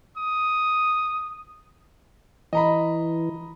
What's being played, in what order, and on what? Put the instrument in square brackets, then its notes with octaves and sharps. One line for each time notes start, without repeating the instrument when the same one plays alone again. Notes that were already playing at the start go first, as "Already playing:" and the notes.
[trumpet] D#6
[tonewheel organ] E3 [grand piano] D#5 A#5 B5